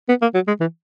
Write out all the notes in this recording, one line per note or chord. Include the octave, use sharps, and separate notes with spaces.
B3
A#3
F#3
G#3
E3